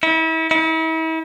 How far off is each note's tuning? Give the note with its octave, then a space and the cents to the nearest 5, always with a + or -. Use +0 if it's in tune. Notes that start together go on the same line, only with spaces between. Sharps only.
E4 -35
E4 -40